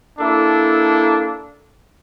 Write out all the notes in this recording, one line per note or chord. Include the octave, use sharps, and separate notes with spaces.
A#3 D4 E4 A4